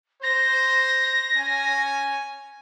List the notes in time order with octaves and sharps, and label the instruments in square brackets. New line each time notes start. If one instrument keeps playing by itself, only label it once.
[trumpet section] C5 [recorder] A#6
[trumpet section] C#4 G#5